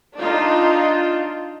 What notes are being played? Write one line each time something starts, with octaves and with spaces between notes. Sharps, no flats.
D4 D#4 F4